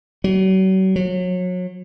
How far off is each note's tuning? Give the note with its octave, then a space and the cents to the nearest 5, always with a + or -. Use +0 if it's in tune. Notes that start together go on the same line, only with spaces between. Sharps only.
F#3 +40
F#3 -30